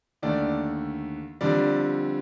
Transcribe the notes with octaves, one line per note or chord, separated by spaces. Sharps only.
D#2 D3 A3 D5
F2 D3 G3 D5